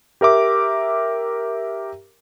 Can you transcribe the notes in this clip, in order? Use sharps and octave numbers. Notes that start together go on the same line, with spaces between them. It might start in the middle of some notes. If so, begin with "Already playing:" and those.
G4 A#4 E5 D6